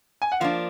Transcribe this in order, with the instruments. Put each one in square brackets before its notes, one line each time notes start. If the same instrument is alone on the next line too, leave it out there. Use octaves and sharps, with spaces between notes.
[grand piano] G#5
F#5
[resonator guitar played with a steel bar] F3 A#3 D4 [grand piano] F5